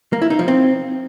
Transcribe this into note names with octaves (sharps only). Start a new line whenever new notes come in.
A#3
E4
D#4
F3
C4